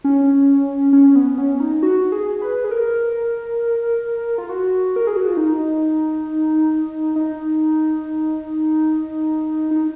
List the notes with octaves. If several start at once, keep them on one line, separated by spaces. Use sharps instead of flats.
C#4
C#4
B3
C#4
D#4
F#4
G#4
B4
G#4
A#4
F4
F#4
A#4
G#4
F#4
F4
D#4
D#4
D#4